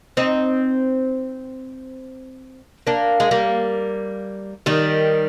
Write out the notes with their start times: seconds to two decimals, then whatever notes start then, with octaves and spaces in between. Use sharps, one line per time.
0.17 C4 D#4
2.87 A#3 D4
3.20 G#3
3.31 G3 A#3
4.66 D#3 G3